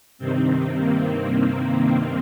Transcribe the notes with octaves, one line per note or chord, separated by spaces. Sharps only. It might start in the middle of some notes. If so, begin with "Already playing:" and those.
G2 C3 D#3 C4
A#3